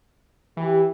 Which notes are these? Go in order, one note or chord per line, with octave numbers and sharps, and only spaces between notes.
E3 G4